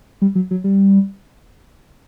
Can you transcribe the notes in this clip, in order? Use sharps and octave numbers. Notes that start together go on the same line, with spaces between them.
G3
F#3
F#3
G3